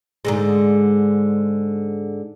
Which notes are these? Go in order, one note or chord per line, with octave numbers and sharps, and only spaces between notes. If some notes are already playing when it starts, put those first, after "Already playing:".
G#2 D3 G#3